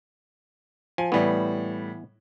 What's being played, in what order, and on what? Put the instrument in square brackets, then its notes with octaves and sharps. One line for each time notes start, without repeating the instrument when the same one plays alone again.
[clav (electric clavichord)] F3 [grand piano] G#5
[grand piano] A2 G3 [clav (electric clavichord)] E3 B3